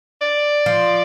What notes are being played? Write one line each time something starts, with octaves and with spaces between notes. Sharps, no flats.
D5
F3